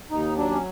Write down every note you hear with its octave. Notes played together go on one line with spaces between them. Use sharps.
D#2 D#4
F#3 D4
C#4